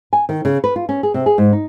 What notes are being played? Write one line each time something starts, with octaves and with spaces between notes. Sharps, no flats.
G#5
D#3
C#3
B4
F4
C#4
G#4
C3
G#4
G#2
D#4